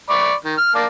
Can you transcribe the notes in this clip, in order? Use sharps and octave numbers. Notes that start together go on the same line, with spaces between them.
D5 B5 C#6
D#3
F6
A#3 D5 A5